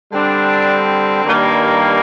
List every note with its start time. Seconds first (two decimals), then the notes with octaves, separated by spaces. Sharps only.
0.13 D3 G3 C4 D4
1.25 G2 D#3 G3 A#3